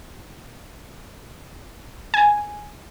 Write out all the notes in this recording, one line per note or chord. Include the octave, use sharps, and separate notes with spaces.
G#5